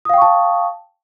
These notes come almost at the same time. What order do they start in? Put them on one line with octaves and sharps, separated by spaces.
D#6 F5 G5 C#6 A5